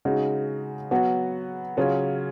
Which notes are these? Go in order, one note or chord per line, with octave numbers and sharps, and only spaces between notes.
C#3 G#3 D#4 F#4
F#3 B3 F#4
C#3 F#3 C#4 F4